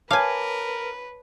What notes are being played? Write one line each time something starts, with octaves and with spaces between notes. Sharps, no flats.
A#4 B4 C#5 F5 G#5 A5 D6